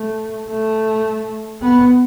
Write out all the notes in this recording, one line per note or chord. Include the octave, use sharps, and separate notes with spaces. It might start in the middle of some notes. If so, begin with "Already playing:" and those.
Already playing: A3
A3
B3